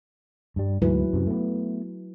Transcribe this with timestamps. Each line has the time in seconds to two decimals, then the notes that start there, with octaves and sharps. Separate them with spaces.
0.56 G2 G3
0.82 D2 G#2 E3 F#3 E4 B4
1.13 F#2 C3
1.27 A3 B3